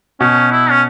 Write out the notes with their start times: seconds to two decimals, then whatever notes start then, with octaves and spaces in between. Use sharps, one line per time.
0.20 B2 C#4
0.52 E4
0.71 C#4